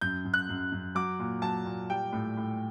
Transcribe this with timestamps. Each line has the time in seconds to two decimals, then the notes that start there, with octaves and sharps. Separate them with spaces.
0.01 F#2 G6
0.25 F#2
0.34 F#6
0.49 F#2
0.72 F#2
0.95 F#3 D6
1.19 A#2
1.42 F#3 A5
1.66 A#2
1.89 G3 G5
2.12 A2
2.37 A2